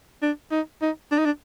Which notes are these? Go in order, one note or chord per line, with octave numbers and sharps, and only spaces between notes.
D4
D#4
D#4
D4
D#4
D4